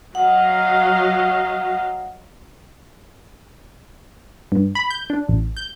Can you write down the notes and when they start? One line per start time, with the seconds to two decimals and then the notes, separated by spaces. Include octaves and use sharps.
0.15 F#3 D#5 F5 F#5
4.52 G2
4.75 B5
4.90 G6
5.10 D4
5.28 A1
5.57 G6